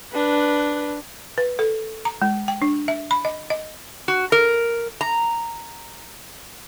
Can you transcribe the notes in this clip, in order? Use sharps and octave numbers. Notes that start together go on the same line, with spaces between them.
D4 B4
B4
A4
A#5
G#3
G5
D4
E5
B5
D#5
D#5
F#4
A#4
A#5